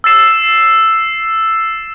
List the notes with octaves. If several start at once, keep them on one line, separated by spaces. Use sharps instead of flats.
E6 A6 C7 E7